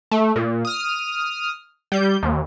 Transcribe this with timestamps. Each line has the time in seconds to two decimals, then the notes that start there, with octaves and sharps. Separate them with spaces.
0.11 A3
0.36 A#2
0.65 D#6 F6
1.92 G3 G6
2.23 D#2